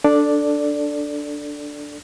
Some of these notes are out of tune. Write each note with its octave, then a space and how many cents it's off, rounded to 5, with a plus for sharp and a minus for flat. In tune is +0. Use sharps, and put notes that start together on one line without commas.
D4 +0 A4 +5 D5 +0